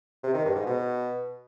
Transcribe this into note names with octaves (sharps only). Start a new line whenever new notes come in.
C3
D#3
G2
G#2
B2